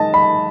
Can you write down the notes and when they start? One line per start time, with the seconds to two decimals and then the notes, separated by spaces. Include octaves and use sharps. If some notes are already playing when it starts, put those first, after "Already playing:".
Already playing: D#3 G#3 D#5 A5
0.14 B5